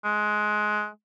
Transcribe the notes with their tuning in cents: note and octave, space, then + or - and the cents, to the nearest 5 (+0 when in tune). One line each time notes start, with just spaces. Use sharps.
G#3 +20